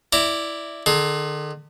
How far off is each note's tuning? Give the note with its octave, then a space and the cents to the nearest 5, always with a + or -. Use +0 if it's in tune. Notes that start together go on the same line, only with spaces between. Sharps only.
E4 +0 D5 +0 A#5 -25
D3 +45 G#4 +30